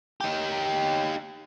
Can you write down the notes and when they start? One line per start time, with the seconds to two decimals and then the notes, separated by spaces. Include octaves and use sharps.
0.21 D#4 G4